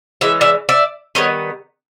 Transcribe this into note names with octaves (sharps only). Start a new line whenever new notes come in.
E3 G#3 C#4 E5
D5 E5
D5 E5
D#3 G3 B3 C#5 D#5